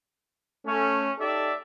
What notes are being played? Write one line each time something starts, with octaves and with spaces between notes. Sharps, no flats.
A3 C#4
D#4 G4 A4 D5 E5